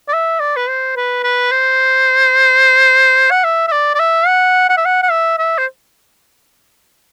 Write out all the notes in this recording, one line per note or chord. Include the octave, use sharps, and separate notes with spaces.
D5
E5
D5
B4
C5
B4
B4
C5
F#5
E5
E5
D5
D5
E5
F#5
F#5
E5
F#5
F#5
E5
E5
C5